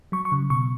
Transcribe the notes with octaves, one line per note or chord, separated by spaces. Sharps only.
F#3 C#6
C#6
C#3
B2 C#6